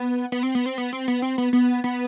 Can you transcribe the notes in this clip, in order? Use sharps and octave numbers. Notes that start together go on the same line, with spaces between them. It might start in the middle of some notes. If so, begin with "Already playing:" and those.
Already playing: B3
B3
C4
B3
C4
B3
C4
B3
C4
B3
B3
B3